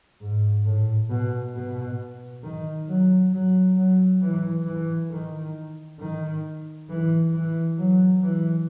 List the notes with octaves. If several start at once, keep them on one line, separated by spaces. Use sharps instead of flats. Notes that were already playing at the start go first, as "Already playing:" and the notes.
G#2
A2
B2
B2
D#3
F#3
F#3
F#3
E3
E3
D#3
D#3
E3
E3
F#3
E3